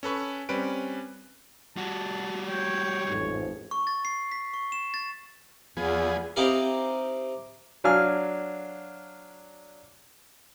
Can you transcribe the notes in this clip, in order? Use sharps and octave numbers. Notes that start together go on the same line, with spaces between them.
C#4 A4 B4 C#6
G3 C4 C#4 B4 D7
G3 F#4 A5
C#5 G5
A1 F2 G#2
C#6
A6
C7
B6
C#6
E7
A6
E2 F3 B3 G#4
C4 D#4 E4 G4 A#4 F5
F#3 D4 F5 G#5 F6